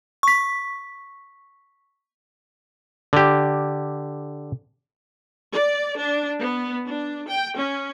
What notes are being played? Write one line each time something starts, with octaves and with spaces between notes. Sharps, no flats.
C#6 B6
D3 G4
D5
D4
B3
D4
G5
C#4